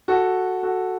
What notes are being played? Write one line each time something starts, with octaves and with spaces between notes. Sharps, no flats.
F#4 A4
F#4 A4